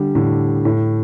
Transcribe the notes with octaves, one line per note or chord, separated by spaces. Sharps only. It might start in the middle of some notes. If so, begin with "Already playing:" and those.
Already playing: D3 G3
A2 D3
A2